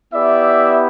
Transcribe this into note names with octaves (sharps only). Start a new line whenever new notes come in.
B3 E4 G4 D5 E5